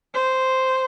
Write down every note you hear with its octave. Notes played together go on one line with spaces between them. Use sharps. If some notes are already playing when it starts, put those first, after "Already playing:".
C5